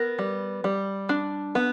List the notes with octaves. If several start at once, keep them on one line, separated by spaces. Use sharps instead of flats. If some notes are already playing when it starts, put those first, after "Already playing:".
Already playing: B3 A#4
G3
G3
D4
B3